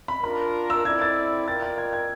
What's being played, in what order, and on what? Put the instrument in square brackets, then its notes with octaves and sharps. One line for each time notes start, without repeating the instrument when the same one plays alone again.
[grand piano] B5
[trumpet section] D4 F4 A#4 [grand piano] B5
[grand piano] E6
[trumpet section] C4 E4 A4 D5 [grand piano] G#6
[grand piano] A6
[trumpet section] F4 A#4 D5 G5 [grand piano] A6
[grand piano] A6
G#6
G#6